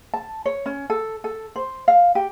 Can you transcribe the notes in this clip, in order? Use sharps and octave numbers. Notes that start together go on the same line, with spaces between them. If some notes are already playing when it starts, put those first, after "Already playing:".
A5
C#5
C#4
A4
A4
C5
F5
G4